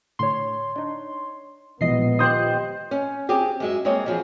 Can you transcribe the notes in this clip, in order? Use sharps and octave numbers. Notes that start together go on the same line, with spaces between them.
A2 D3 C#5 C6
D4 D#4
A#1 B2 E3 F3 G#3 B3 D#5 C7
D#3 F4 G4 C5 D#5 D#6 F#6
C#4
C4 D4 G4 G#4
F#2 G#3 E5
G3 G#3 A#3 C4 C#5 D#5
E2 F3 G#4